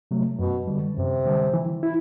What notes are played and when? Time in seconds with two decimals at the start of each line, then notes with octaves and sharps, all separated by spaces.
0.11 C3 F#3 A3
0.39 F#2 B2
0.67 D3 G3
0.96 F#2 C3
1.26 D3 G3
1.54 E3
1.83 E4